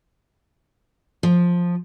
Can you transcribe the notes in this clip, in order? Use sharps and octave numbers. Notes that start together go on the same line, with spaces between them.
F3